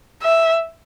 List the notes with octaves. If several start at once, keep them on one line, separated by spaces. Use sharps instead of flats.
E5